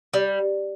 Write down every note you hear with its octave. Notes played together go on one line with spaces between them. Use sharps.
G3